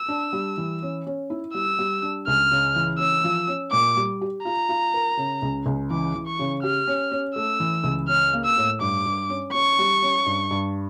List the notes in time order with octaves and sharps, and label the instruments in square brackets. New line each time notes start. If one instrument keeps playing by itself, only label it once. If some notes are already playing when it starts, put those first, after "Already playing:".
Already playing: [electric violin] E6
[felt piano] D4
G3
E3
C#4
C#4
E4
[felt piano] G3 [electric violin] E6
[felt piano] G3
D4
[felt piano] C#2 [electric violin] F6
[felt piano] C#3
E3
[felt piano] C#4 [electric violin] E6
[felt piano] F3
C#4
[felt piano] A#2 [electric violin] D6
[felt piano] G3
G4
[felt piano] F4 [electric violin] A#5
[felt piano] F4
A#4
C#3
C#2
C#2
[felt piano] E3 [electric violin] D6
[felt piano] E3
[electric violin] C#6
[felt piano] C#3
[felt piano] G4 [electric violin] F6
[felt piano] C#4
C#4
[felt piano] A3 [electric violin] E6
[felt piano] E3
C#2
[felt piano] C#4 [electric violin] F6
[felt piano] A#3
[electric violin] E6
[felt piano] A2
[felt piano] G2 [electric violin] D6
[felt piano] G2
C#4
[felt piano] C#4 [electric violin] C#6
[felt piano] G3
C#4
G2
G2